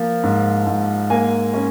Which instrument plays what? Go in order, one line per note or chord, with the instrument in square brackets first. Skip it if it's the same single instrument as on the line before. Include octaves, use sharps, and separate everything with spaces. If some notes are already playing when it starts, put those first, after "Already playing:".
Already playing: [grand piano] F3 A#3
G#2
G#2
A#3 G#5
C#4